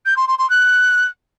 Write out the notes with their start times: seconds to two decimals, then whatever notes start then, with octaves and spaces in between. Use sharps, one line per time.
0.05 G6
0.16 C6
0.27 C6
0.38 C6
0.49 F#6